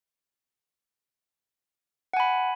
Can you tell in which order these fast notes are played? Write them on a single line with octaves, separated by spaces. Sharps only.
F#5 G#5 B5